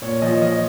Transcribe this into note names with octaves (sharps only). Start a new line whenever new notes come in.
A#2 C#5
F3 D#5
F3 D#5